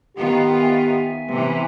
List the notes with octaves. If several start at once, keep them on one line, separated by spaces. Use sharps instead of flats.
D#3 B3 F4 G4
E5 G#5
C3 E3 B3